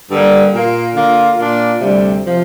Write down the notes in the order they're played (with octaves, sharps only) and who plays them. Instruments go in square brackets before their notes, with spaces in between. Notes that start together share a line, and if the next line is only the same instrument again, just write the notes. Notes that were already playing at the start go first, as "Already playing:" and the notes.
[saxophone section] G2 D3 G3 A#3
A#2 A#3 F4
D3 A#3 F4
A#2 A#3 D4 F4
D2 C3 G3
C3 F3